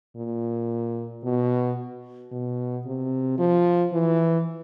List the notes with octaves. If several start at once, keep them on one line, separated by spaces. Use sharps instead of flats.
A#2
B2
B2
C3
F3
E3